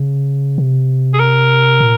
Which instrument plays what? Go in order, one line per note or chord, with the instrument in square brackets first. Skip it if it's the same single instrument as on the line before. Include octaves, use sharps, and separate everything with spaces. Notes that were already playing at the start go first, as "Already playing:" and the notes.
Already playing: [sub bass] C#3
C3
[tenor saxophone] G#4
A#4
[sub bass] A#2